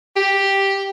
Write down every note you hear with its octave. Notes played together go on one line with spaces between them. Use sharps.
G4